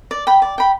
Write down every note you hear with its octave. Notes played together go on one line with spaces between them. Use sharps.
D5
G5 B5
D5
G5 B5